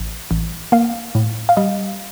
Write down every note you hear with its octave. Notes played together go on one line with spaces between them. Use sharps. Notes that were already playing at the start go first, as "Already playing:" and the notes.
Already playing: A1
A1
A#3 F5
A2
F5
G3 D#5